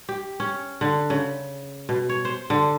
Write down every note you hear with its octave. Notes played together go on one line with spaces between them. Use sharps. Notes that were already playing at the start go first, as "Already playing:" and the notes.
G4
C#4
D3
C#3
B2
C#5
C5
D3